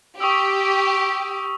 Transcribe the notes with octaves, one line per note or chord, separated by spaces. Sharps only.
G4 C#6 D#6 E6